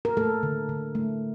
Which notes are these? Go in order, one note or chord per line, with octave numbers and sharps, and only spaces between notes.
A#4
A3 A4
D3
D3
A3